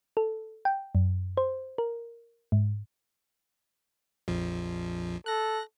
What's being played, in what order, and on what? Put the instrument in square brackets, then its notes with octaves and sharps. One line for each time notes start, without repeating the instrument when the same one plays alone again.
[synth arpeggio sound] A4
G5
F#2
C5
A#4
G#2
[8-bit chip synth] A#1 F2 F3
[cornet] A4 [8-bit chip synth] F#6 A#6